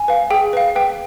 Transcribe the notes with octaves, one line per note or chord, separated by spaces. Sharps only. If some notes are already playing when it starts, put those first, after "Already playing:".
Already playing: G#5
B4 F5
G#4 G5
B4 F5
B4 G5